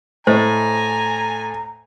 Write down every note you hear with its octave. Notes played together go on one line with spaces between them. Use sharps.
A2 C5 D#5 G#5 A#5